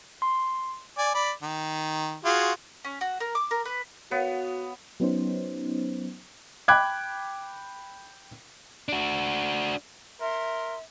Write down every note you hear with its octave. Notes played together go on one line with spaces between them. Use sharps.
C6
D5 G#5
D5 B5
D#3
F4 F#4 G#4
C#4
F#4
A#4
D6
A#4
B4
B3 F#4 C#5 F5
F#3 B3 C#4 D#4 C5
G5 B5 D6 F#6 G#6
D4 F#4
A#4 E5 C6